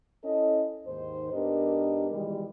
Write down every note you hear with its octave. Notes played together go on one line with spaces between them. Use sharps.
C#4 E4 A4 D#5
D#2 G#2 D#3 C5
G#2 B3 D4 G4 A#4 D#5
B2 D#3 E3 G3 G#3